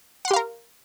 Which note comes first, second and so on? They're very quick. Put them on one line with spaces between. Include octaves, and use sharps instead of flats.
F#5 C6 G4 F5 A#4